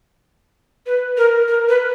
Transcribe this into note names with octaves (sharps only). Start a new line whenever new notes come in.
B4
A#4
A#4
B4